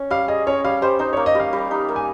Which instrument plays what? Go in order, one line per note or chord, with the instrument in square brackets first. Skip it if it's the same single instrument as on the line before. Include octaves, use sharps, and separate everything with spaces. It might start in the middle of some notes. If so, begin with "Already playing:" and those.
Already playing: [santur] C#4
[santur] G3 [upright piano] F5
[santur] G#4 [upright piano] D#5
[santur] C#4 [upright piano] C#5
[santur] G3 [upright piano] F5
[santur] G3 [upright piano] C5
[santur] D#4 [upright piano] C5
[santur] A#3 [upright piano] C#5
[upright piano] D#5
[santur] G3 [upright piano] F5
[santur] G3
D#4
A#3
[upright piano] G#5